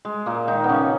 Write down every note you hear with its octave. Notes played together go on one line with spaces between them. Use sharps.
G#3
A#2 A#3
D#3 D#4
B3
C#3 C#4